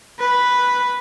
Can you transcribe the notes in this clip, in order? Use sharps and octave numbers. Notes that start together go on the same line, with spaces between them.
B4